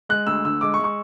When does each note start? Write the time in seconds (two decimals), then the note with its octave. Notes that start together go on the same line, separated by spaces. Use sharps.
0.09 G#3 F#6
0.27 D2 E6
0.45 D3 E6
0.61 G#3 D6
0.74 C#6
0.79 G#3
0.84 C#6